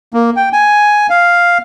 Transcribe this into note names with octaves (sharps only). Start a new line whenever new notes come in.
A#3
G5
G#5
F5